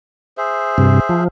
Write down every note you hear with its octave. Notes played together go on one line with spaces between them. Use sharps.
G#4 C5 E5
G2 C3
F3